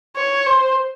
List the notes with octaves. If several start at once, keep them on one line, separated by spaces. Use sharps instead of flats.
C#5
C5